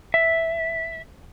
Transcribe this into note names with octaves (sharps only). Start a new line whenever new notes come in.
E5